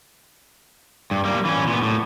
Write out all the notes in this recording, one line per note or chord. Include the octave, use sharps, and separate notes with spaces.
G2
G3 A#3
E3 C#4
A#2 B3
A2